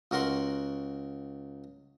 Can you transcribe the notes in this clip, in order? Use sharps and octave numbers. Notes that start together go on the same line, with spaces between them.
C#2 F#4 A#4 F#5 C6